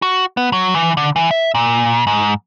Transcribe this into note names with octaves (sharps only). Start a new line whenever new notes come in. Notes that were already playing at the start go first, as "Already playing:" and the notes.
F#4
B3
F#3
E3
D3
E3
E5
A#2
G#2